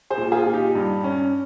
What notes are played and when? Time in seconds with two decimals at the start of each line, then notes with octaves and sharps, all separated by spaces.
0.10 G#4 C5
0.18 A#2
0.32 F4 G#4
0.46 A#2
0.54 D#4 G4
0.75 G2
1.04 C#4